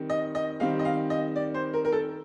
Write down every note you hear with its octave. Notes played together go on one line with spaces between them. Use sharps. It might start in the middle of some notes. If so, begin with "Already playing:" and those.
Already playing: D#3 G3 C4
D#5
D#5
D#3 G3 C4 F5
D#5
F5
D#5
D5
C5
A#4
A#4
A4